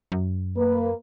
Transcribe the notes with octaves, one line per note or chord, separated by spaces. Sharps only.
F#2
A#3 B4